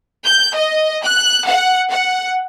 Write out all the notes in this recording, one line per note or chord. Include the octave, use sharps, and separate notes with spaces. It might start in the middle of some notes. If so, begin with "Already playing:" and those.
G6
D#5
F#6
F#5
F#5